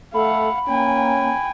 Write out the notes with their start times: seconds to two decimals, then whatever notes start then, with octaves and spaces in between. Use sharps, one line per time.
0.14 A3 A4 F5 F#5 B5
0.68 A#3 C#4 G5 G#5